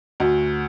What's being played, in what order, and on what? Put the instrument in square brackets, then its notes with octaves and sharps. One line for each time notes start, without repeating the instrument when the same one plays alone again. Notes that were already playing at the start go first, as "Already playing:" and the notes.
[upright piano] D2